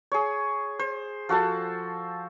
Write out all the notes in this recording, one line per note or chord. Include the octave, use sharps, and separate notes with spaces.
G#4 C#5
C5
F3 F#4 A4 A5